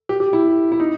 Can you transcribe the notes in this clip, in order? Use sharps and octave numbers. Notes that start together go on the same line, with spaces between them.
G4
G4
E4
E4
D#4